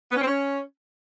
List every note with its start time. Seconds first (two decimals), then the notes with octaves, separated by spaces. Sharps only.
0.11 B3
0.16 C#4
0.21 C4
0.26 C#4